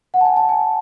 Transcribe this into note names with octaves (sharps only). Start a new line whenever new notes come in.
F#5
A5
G#5
A5
G#5